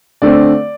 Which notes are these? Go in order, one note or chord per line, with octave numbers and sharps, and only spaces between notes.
D3 A3 C4 D5